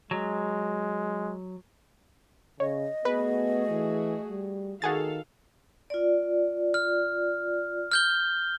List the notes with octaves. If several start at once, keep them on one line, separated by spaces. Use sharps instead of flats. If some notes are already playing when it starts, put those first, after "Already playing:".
F#3 G#3
C#3 C#5 D#5
A3 B3 F#4 G#4 B4
E3
G3
D#3 F#4 G#4 A4 F5 A6
F4 D5
F6
F6 G6 G7